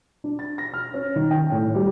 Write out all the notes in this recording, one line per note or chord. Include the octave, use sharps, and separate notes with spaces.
D4
A6
A#6
F6
C#4
D#3
G5
A2
G3